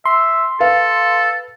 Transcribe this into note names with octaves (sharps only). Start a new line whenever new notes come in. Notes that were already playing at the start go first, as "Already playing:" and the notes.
E5 C6
A4 B4 F5